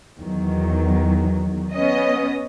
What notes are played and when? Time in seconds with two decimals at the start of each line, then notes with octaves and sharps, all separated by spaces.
0.18 E2 D#3 F#3
1.74 B3 C#4 D#5